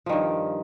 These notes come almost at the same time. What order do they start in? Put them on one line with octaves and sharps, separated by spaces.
F3 D#3 G2